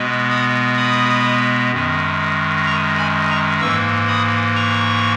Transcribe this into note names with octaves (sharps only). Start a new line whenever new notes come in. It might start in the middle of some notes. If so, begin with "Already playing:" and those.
Already playing: B2 G#3 B3
B5 D#6
B5 D#6
F#2 D#3 G#3
A#5 C#6
G#5 B5
A#5 C#6
G#2 E3 A#3 C#6 E6
B5 D#6
A#5 C#6